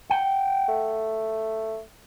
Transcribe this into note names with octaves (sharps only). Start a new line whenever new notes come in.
F#5 G5
A3